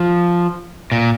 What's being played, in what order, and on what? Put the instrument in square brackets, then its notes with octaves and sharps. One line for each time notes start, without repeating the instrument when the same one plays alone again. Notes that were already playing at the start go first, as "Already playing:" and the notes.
Already playing: [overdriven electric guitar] F3
A#2